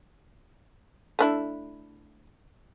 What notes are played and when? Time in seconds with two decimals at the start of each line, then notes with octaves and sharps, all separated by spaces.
1.19 A3 D4 E4